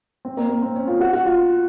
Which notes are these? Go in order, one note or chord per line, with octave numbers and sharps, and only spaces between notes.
C4
A#3
A#3
C4
C#4
F4
F#4
F#4
F4